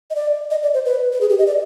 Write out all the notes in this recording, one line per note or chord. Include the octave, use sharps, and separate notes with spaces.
D#5
D5
D#5
D5
C5
B4
B4
G#4
G4
D#5
D5